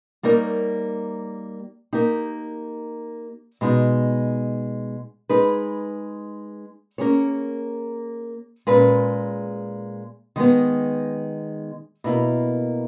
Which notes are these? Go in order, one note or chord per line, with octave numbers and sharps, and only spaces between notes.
G3 A#3 D#4 A#4 C#5
A#3 D#4 G4
B2 G#3 D#4
G#3 D#4 G#4 B4
A#3 C#4 G#4 C#5
A#2 G#3 C#4 G#4 B4
D#3 G#3 B3
B2 A#3 E4